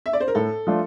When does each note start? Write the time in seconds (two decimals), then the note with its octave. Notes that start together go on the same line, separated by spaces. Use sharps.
0.06 E5
0.13 D5
0.21 C5
0.28 A#4
0.35 A2 A4
0.67 F3 A3 D4 F4